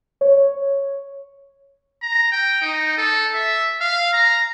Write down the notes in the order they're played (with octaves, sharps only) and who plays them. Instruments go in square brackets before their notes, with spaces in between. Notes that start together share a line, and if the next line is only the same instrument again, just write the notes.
[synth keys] C#5
[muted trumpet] A#5
G5
D#4
A4
E5
F5
A#5